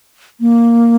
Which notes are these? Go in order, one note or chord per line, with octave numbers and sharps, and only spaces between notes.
A#3